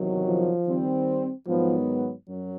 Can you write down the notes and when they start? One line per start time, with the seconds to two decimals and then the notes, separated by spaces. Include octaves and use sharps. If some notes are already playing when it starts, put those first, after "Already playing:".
Already playing: E2 C3 D#3 F#3
0.26 F3
0.67 D#3 G3 C4
1.47 G#2 D#3 F3 F#3 B3
2.28 F#2 F#3